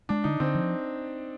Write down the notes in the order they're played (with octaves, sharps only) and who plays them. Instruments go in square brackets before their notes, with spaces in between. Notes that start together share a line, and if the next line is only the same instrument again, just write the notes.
[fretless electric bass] G#3 [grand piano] D4
[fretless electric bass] D3 [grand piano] D#4
[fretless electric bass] D3 [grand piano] C4
[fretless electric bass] F3